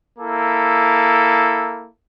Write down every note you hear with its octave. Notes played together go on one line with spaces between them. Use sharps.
A#3 E4 A4